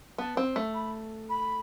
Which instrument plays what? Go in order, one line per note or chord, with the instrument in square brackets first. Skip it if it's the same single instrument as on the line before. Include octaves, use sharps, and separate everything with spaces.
[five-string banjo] B3 [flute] A5
[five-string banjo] C4
A3
[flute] B5
B5